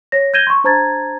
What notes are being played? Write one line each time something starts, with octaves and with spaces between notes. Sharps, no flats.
C#5 A#6
G6 G#6 A#6 D#7 E7 G7
C6 C#6
D4 C5 A5 A#5 G#6 A6